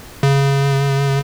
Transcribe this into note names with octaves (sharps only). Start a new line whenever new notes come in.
C#3